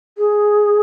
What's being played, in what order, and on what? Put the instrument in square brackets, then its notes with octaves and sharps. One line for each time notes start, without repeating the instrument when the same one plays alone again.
[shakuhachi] G#4